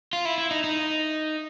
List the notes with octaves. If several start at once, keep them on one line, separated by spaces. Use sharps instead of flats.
F4
E4
E4
D#4
D#4